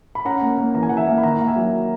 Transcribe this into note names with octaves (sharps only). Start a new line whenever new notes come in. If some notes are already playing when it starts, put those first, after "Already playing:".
B5
C#4 F#5 A#5
A#3
A#3
E3 A#5
G#5
E3 F#5
E5 G#5
A#3
B5
D#3 F#5 A#5
A#3
E5 G#5
F#3